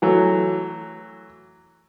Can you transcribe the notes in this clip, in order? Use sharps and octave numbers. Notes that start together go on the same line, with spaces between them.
E3 F#3 A3